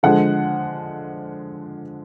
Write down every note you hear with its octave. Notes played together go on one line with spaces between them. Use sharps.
D3 F3 G#3 F#5